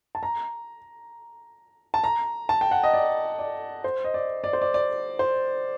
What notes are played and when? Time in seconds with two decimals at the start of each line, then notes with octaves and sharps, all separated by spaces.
0.15 A5
0.23 A#5
1.94 A5
2.04 A#5
2.49 A5
2.61 G5
2.71 F#5
2.83 D#5
2.94 D5
3.39 D5
3.84 C5
4.04 D#5
4.14 D5
4.44 D5
4.53 C5
4.61 D5
4.74 D5
5.19 C5